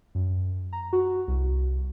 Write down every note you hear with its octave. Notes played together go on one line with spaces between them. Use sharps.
F#2
A#5
F#4
C2